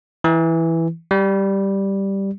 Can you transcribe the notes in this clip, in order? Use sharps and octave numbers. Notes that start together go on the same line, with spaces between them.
E3
G3